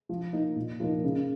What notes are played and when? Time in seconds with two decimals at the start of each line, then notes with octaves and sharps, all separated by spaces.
0.09 F3
0.33 A#3 D#4
0.56 A#2
0.80 F3 A#3 D#4 A#4
1.04 C#3